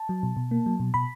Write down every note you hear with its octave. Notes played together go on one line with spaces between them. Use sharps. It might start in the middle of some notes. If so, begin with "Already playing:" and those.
Already playing: A5
F#3
B2
B2
A#3
F#3
B2
B2 B5